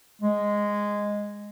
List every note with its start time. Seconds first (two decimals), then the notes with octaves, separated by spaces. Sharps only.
0.22 G#3